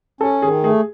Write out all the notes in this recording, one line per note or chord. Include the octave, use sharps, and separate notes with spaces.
C#4 A4
D#3 G#4
A3 G#4